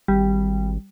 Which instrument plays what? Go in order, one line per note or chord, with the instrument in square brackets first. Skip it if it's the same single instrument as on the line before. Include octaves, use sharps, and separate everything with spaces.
[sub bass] G#1 [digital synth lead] G3